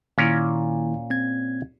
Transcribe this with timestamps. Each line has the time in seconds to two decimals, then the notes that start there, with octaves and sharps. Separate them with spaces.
0.18 A#2 D#3 A#3 C#4 E4 A#4
1.10 C4 G#6